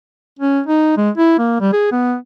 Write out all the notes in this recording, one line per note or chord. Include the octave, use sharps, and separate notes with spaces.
C#4
D#4
G#3
E4
A#3
G3
G#4
B3